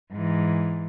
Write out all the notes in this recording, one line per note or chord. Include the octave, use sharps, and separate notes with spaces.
G#2 E3